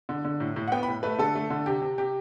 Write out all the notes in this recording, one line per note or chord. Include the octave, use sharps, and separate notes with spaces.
D3
D3
A2
A2
F#5
B3 G5
B5
A2
A3 B4
D3 A4
A3
D3
C3 G4
C3
C3 G4